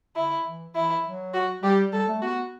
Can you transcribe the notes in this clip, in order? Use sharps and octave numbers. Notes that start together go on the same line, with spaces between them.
D3 E4
E3
E3 E4
F#3
F#4
G3 G4
G3 A4
A3
B3 F#4